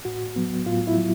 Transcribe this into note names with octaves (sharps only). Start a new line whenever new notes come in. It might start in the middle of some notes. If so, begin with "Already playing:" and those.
A2 F#4
F#3 B3
A2 F4
E4
F#3